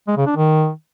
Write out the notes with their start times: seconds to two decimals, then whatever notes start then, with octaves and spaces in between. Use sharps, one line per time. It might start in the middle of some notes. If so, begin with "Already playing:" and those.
0.07 G#3
0.17 C#3
0.26 D4
0.36 D#3